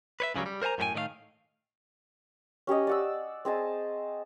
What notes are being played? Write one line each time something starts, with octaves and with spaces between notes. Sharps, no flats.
B4 C#5 E5
C#2 C#3 E3 F#3 G3
G3
A#4 C5 D5 G#5 A#5
F#2 A2 G4 B4 G5 G#5
A2 D#3 A3 D5 F5
C#4 G4 C#5 D#5
D5 F#5 E6
C4 G#4 D#5 A5